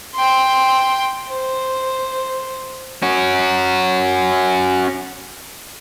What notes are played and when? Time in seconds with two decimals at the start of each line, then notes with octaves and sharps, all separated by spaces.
0.15 G5 C6
1.29 C5
3.03 C#4 F#4